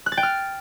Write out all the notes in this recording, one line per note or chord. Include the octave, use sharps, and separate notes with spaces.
F#6
A6
G5
F6